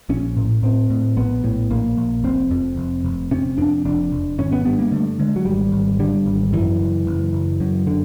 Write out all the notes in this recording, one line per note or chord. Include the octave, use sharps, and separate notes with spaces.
A#1 C#4
A2
A2 C4
A2
A#1 B3
A2
A#1 A#3
A#1
F1 C4
F2
F1
F1
C3 C#4
F2 D4
F1 D4
F1
G#1 C#4
B3
G2 B3
A#3
D3 A3
D3 G#3
F#3
G#1 G3
G#1
D3 G3
G#1
F#2 E3
F#1
F#1
F#1
F#2
D3